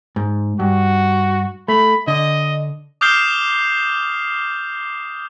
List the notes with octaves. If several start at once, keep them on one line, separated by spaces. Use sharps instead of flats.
G#2
G2 F#4
A3 B5
D3 D#5
D6 D#6 F6 G6 C7 G7